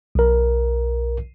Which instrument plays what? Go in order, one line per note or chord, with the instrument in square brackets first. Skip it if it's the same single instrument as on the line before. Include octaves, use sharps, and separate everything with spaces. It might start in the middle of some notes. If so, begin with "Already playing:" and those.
[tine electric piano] B1 A#4